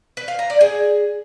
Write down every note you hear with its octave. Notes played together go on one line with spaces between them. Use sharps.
B4
F5
A#5
D5
G#4